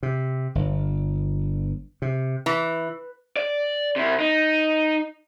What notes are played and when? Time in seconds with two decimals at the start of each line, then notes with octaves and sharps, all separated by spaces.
0.03 C3
0.55 G1
2.02 C3
2.46 E3
3.36 D5
3.96 C3 E4
4.20 D#4